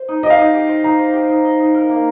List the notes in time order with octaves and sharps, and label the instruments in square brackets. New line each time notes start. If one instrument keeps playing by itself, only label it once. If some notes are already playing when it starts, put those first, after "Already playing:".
Already playing: [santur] C5
D#4
[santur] G4 [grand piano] D#5
[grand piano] F5
[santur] D#4 [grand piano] D#5
[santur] G4
C5
[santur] D#4 [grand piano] A#5
[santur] C5
G4
D#4
D#5
D#4
A#4
A#3